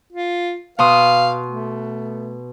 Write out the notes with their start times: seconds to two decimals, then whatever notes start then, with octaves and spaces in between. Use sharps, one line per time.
0.13 F4
0.79 B2 F5 C6 D#6
1.48 A3